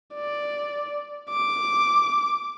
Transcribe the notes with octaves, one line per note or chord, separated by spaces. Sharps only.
D5
D6